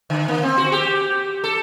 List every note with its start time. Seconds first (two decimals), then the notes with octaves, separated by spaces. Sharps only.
0.10 D3
0.28 A#3
0.43 C4
0.58 F#4
0.72 G4
1.44 A4